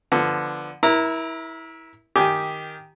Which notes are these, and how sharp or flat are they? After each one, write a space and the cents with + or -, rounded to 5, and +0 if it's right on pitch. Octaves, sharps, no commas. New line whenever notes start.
D3 +0 F3 -10 B3 -15
E4 -15 A#4 +30 A#5 +0
D#3 +0 G4 +0 G#5 +0